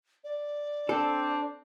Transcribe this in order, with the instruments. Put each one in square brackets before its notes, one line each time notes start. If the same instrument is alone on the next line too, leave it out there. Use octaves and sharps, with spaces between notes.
[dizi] D5
[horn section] C4 [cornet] D4 [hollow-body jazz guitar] A4